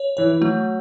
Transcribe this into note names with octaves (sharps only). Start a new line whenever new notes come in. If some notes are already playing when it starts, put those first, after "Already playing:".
Already playing: C#5
E3 C#5
E3
F#3 A3